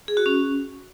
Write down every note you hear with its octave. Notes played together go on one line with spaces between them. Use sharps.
G#4
F#4
C#4